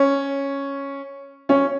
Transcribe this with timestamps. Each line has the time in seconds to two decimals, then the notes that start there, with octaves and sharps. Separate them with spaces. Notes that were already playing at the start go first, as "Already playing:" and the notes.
Already playing: C#4
1.49 C#4